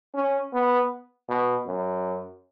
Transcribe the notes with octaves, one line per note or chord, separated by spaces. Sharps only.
C#4
B3
B2
F#2